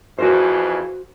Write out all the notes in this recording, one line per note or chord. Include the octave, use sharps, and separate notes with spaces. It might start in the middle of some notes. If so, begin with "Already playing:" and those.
F2 C#3 E3 F#4 A#4 C5